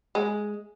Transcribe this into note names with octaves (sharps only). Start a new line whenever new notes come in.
G#3